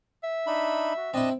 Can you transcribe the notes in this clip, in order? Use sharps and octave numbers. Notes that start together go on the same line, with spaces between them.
E5
D4 D#4 B5
F#4
C4 D4 E4 D#5 A5